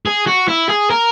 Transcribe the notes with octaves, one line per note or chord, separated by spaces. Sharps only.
G#4
F#4
E4
G#4
A#4